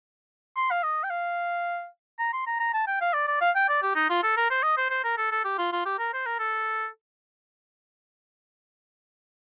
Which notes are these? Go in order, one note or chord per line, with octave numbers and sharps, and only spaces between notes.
C6
F5
D#5
G5
F5
A#5
C6
A#5
A#5
A5
G5
F5
D5
D5
F5
G5
D5
G4
D#4
F4
A4
A#4
C5
D#5
C5
C5
A#4
A4
A4
G4
F4
F4
G4
A#4
C5
A#4
A4